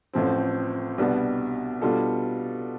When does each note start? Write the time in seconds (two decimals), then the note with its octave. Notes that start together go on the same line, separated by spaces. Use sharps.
0.13 A1 A2 F3 C4
0.98 C2 B2 G3 B3 D4
1.82 B2 G3 D4 F4 A4